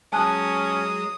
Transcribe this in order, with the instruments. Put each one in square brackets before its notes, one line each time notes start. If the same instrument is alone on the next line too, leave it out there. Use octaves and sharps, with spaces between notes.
[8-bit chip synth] F#3 G#3 [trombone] C#4 [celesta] G#5 A5 F#6 [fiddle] D#6